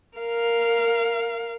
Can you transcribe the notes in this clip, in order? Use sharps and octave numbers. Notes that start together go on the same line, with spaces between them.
A#4 F5